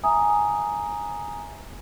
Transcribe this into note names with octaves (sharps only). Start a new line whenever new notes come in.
E5 G#5 A#5 D#6